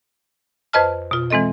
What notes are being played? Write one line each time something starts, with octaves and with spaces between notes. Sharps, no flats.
F2 B4 C5 D#5 A5 F6
B2 F4
E3 G#3 C4 A4 D#5